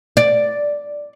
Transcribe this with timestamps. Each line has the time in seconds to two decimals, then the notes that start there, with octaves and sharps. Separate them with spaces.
0.17 D5